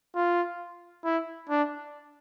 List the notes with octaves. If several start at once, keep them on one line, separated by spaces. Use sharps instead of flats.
F4
E4
D4